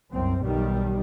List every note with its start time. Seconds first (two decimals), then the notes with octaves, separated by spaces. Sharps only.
0.12 C2 F#2 C4
0.44 B1 B2 D#3 G3